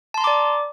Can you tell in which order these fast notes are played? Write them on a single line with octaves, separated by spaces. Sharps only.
A5 C6 A#5 D6 D5